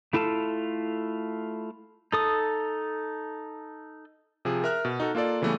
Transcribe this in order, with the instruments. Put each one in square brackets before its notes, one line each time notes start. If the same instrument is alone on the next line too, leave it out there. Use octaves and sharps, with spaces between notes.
[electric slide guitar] A3 E4 F4 A4 A5
[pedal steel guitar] D#4 A4 D#6
[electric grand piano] C3 F3 G#4
A#4 E5 F6 F#6
B2
D#4 F#4 A4
A#3 F4 A4 D5
C#3 E3 G3 A3 B3